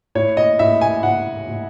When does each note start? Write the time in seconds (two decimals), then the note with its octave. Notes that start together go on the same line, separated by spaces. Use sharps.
0.15 A2 C#5
0.37 D#5
0.59 A2 E5
0.81 G#5
1.03 A2 F#5
1.48 A2